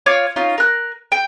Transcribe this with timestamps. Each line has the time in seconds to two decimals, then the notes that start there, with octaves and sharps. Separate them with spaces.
0.06 F4 C#5 F5 D6
0.36 C#4 D#4 F4
0.58 A#4 F#6
1.12 G5